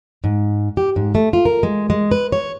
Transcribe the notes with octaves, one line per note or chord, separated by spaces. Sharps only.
G#2
G4
G#2
A3
F4
A#4
G#3
G#3
B4
C#5